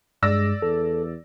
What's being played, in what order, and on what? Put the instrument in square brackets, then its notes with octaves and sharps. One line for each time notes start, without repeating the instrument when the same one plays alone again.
[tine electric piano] G2 [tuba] G#3 [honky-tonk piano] D5 E6 A#6
[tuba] E2 [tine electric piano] A4